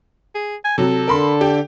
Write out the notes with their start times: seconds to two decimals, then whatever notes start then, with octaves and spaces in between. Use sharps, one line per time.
0.35 G#4
0.65 G#5
0.78 C3 F#3 A4
1.08 D3 A#4 B5 C6
1.41 G4